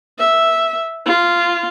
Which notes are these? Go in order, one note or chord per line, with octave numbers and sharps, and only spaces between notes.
E5
F4